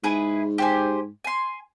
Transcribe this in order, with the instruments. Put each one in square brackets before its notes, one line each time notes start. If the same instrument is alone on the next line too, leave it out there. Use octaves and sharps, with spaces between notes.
[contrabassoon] G#2 [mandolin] E4 G#4 B4
[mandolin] G4 C5 G#5
G#5 C6